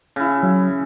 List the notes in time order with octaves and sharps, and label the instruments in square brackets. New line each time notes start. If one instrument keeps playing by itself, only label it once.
[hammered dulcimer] C#3 E4
[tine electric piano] F#3